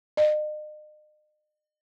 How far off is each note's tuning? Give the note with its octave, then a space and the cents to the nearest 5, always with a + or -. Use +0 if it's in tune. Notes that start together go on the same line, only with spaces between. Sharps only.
D#5 -40